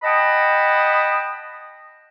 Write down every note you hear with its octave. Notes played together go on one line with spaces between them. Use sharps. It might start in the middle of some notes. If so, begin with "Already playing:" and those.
D#5 F#5 G5 A5 B5 D#6